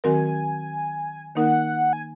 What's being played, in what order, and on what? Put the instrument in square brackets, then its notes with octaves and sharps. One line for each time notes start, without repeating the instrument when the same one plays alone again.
[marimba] D#3 F#3 C4 F#4 A#4 [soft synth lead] G#5
[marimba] D#3 A#3 D#4 A#4 [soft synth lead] F#5
[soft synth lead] G#5